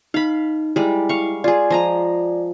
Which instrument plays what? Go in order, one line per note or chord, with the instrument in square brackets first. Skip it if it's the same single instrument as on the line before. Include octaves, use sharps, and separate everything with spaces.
[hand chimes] D#4 [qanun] F5 B5
[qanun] G3 G#3 [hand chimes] E4
[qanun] F5 C#6
[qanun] F4 G#4 [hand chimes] D5
[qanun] F3 D#5 A#5